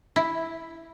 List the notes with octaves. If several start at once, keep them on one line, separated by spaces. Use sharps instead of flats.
E4